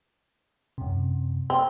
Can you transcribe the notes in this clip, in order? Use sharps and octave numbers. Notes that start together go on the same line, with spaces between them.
F#2 C3
C4